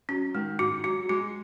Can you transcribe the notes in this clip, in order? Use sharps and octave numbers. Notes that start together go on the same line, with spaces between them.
F#3 C#4
D#3 G#3
G#2 F#4
F#3 F#4
F#3
G#3 F#4